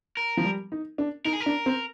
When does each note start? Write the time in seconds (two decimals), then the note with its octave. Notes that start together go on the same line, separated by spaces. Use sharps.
0.17 A#4
0.37 F3
0.45 G3
0.72 D#4
0.98 D4
1.25 D#4 A#4
1.33 G#4
1.40 A#4
1.46 D4
1.66 C4